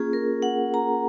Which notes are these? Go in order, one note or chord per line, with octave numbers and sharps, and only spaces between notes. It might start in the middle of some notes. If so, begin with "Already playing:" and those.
Already playing: A#3 C#4 F4 G#4
A#4
F#5
A#5